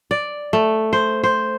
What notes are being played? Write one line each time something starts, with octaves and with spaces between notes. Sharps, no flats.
D5
A3
C5
C5